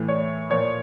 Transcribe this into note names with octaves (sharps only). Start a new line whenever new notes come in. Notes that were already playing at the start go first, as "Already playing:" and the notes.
Already playing: A2 E3
C#5
A#2 F3 C#5